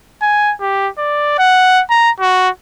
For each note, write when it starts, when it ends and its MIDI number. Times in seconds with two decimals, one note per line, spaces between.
0.22 0.53 80
0.61 0.88 67
0.98 1.36 74
1.39 1.82 78
1.90 2.11 82
2.20 2.49 66